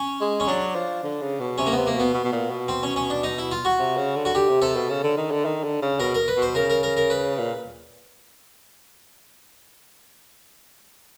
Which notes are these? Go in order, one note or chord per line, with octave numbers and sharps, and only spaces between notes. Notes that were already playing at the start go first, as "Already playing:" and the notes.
Already playing: C#4
G#3
C#4
F#3 D4
F3
D3
C#3
B2
C3 C#4
A#3
C3 B3
A#3
B2 B3
B2
B2
A#2
B2
C4
C#4
C#4
D4
D#4
E4
F4
F#4
C3
C#3
D3
F#4
D3 G4
C3
C3 A4
B2
C#3
D3
D#3
D3
D#3
D3
C#3
B2 A#4
A#4
B4
B2
C5
C#3 A#4
A#4
A#4
A#4
B4
A#2